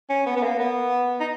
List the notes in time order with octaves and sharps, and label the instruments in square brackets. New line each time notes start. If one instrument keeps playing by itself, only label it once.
[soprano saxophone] C#4
B3
B3
A#3
B3
D#4